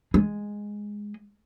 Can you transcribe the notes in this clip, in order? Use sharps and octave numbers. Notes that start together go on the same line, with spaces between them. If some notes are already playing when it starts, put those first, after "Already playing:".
G#3